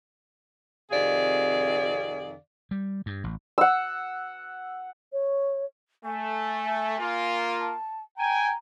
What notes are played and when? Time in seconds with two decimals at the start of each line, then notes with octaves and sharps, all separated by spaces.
0.91 F2 C3 D#3 G#4 D5 F5
2.71 G3
3.06 G2
3.24 A1
3.58 F#5 E6
5.13 C#5
6.04 A3 G#5
6.98 A#3 F4
7.60 A5
8.17 G5 G#5 A#5